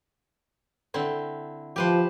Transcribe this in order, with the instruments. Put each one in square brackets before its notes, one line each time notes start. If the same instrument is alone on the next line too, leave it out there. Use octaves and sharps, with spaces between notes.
[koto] D3 C4 E4
[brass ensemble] F3 [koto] G4 B4 C5